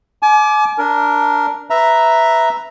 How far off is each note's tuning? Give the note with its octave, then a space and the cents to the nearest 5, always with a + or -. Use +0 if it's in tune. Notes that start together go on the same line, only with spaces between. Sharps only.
G#5 +40 D6 +0
D4 -10 A#4 +0
B4 +0 E5 +0 A#5 +0